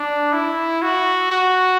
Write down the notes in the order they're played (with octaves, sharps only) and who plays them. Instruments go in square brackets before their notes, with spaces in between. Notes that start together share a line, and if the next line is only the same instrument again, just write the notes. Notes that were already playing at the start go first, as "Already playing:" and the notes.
Already playing: [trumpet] D4
E4
F#4
F#4